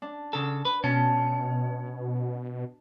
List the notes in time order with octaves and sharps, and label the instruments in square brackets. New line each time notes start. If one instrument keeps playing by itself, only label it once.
[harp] D4
[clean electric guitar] C#3 A4
B4
[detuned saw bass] B2 [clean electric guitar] C#4 [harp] A5